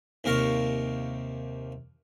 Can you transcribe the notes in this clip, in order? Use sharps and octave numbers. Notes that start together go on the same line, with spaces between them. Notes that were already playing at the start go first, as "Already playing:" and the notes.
D#2 C3 A#4 F5 C#6